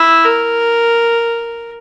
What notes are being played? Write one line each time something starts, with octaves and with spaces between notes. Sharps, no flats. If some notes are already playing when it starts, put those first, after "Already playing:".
Already playing: E4
A#4